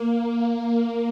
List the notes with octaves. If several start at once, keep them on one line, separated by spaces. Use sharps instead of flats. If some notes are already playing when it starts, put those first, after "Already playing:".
Already playing: A#3